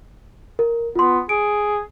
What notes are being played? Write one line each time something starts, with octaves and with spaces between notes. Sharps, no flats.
A#4
B3 F4 C6
G#4 D7